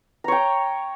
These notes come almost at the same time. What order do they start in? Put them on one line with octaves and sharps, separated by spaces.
A#5 C#5 G5